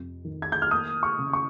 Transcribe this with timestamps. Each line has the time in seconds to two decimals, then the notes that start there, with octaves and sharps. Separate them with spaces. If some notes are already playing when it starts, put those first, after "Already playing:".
Already playing: F2 C3
0.25 D#3
0.42 G#6
0.52 G6
0.62 F6
0.71 A#3 D#6
1.03 C#6
1.18 C#3
1.33 C#6